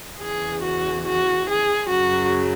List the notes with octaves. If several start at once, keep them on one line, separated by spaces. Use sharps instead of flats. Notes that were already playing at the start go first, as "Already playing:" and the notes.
E2 C#3 E3 G#4
F#4
F#4
G#4
F#2 C#3 F#3 F#4